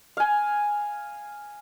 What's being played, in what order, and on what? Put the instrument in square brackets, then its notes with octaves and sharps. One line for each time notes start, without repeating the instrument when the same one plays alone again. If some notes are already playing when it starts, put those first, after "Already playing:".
[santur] F5 G#5